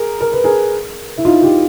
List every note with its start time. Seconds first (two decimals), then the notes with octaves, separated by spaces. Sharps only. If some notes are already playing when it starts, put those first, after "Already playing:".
Already playing: G#4 A#4
0.20 A#4
0.33 B4
0.44 G#4 A#4
1.18 E4
1.25 D#4 F4
1.42 F4 G4